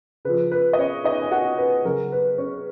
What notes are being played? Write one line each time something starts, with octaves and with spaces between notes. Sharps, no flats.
C#3 F3 B4
B4
D#5
C#4 C#5
D#4 D#5
G#5
F#4 F#5
B4
C#3 F#3 A#4
B4
C#4 C#5